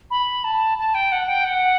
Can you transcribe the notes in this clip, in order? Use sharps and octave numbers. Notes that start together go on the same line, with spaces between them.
B5
A5
A5
G5
F#5
G5
F#5